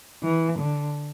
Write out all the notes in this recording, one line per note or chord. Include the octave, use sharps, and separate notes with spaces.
E3
D3